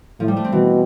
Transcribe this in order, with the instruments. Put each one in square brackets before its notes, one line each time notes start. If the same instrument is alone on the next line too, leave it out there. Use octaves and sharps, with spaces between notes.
[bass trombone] A2 [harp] F3
[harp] G3
A3
C4
[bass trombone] B2 [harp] E3